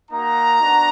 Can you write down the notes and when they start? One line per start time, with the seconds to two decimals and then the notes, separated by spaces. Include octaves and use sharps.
0.10 A#3 D#4 F#4 A#5
0.60 B3 D4 F#4